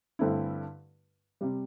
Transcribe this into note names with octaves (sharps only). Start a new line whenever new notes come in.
G2 D3 A3 C4 E4
C3 G3